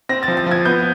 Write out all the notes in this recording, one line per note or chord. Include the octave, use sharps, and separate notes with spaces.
C4 A#6
A6
F3
A6
F3
G#6
B3 G6